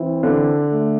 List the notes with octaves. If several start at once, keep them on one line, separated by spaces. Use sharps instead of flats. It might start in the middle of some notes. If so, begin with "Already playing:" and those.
Already playing: E3 C4 E4
D3
A3